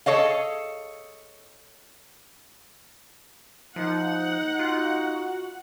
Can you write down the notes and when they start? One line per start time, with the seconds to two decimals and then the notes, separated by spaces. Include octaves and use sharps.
0.06 G#4 A4 C#5 D#5 F5
3.76 F3 D#4 F#5
4.59 F4 F#4